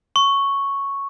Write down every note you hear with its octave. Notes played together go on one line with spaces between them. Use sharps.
C#6